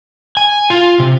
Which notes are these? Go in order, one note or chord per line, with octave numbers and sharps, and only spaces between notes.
G#5
F4
C3